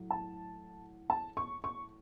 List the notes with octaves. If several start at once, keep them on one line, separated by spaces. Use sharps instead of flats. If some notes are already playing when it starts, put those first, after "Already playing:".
Already playing: A2 F#3
A5
A5
C#6
C#6